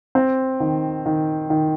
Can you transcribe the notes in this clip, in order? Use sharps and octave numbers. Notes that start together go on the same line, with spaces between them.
C4
D#3
D#3
D#3